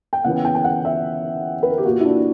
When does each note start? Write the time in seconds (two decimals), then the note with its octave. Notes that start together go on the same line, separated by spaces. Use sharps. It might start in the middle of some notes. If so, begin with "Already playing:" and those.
0.13 G5
0.24 C#3 E3 B3 F#5
0.45 G5
0.55 G5
0.64 F#5
0.85 E5
1.63 B4
1.70 A#4
1.78 G4
1.85 A#2 A#3 F#4
2.00 E4
2.05 D4